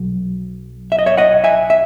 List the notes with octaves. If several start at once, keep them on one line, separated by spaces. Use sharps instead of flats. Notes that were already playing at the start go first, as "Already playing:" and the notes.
Already playing: B1 F#3
E5
D#5
C#5 E5
D#5 F#5
E5 G#5
E5